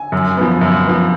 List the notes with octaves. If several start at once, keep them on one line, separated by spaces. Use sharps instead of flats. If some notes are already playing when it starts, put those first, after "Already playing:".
Already playing: G#5
F#2
F3 B3
F#2
F3 B3